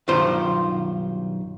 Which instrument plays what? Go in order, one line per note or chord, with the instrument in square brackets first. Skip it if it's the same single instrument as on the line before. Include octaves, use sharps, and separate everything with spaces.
[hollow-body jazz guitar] B1 G2 D#3 F4 C5